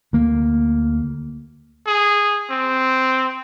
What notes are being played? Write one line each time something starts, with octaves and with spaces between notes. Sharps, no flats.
D2 A#3
G#4
C4